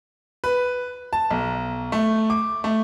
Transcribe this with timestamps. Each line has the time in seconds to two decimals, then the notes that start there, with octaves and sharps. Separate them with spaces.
0.44 B4
1.13 A5
1.31 B1
1.92 A3
2.30 D6
2.64 A3